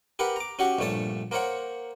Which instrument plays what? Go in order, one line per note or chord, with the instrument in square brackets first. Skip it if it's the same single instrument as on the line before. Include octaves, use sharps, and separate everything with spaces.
[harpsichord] G4 A#4 B4 F#5
A#5 D6
C#4 F#4 G4 F#5
A#1 G2 A3 C#5 A5
A#3 A#4 C5 C#5 F#5